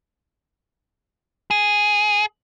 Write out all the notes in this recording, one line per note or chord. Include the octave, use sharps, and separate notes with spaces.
G#4